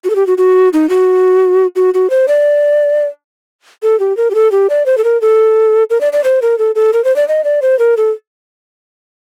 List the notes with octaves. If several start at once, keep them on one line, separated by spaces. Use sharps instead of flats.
F#4
A4
G4
F#4
F#4
D#4
F#4
F#4
F#4
C5
D5
A4
G4
A#4
G4
A4
G4
D5
C5
A4
A#4
A4
A#4
D5
D5
C5
A#4
A4
A4
A#4
C5
D5
D#5
D5
C5
A#4
A4